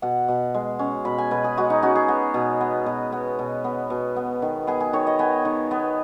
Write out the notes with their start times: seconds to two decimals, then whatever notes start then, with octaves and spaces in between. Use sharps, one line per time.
0.02 B2 F#5
0.28 B2
0.54 G#3
0.79 C#4
1.05 B2 B5
1.18 G#5
1.31 B2 B4
1.44 G#4
1.57 G#3 F#4
1.70 D#4
1.82 C#4 F#4
1.95 G#4
2.08 B3
2.34 B2
2.60 B3
2.86 B2
3.12 B3
3.39 B2
3.64 B3
3.90 B2
4.16 B3
4.42 D#3
4.67 B3 G#4
4.80 G#4
4.93 D#3 C#5
5.07 D#5
5.19 B3 G#5
5.45 D#3
5.71 B3